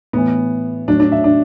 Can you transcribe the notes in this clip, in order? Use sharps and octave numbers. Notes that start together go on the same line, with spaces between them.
A2 E3 B3
A2 F#3 D4
D4
E5
D4